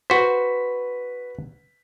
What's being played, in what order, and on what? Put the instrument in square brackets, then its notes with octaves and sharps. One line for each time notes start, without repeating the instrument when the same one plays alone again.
[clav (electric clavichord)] F#4 C5 [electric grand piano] B4 B6